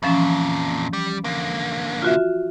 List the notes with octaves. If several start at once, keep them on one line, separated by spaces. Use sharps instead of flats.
F2 A#2 E3 F3 C#4
G3
D3 A#3
F4 F#4 E5